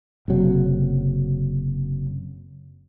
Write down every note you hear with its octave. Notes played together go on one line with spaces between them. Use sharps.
F#1 C3 F#3